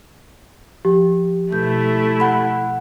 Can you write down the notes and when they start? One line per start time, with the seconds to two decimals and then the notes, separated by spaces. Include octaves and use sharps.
0.85 F3 G4
1.52 B2 A3 E4 G6
2.20 F#5 B5